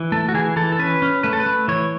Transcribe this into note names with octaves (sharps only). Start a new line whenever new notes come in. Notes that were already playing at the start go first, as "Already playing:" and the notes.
Already playing: E3
A3 A4
F#4
E3 G#4
E3 A4
A4
C#4 B4
C#4
A3 B4
A4
B4
A3
E3 C#5